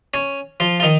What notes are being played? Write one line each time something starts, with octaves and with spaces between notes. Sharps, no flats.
C#4 C#5
F3 F4
F4
D#3 D#4